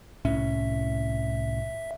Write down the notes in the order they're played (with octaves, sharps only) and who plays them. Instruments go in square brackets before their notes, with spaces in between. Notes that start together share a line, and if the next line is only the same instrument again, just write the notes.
[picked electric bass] C2 A2 C#4 [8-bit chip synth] E5